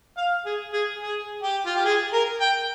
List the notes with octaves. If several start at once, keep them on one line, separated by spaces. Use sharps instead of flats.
F5
G#4
G#4
G#4
G4
F4
G4
G#4
A#4
G5